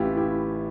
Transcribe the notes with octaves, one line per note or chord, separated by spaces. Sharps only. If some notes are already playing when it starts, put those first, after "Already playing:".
Already playing: A1 A2 E3 E4 F4 G4
E4 G4